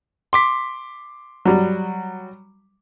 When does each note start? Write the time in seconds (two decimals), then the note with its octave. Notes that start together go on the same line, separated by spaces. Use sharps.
0.33 C6 D6 B6
1.45 F#3 G3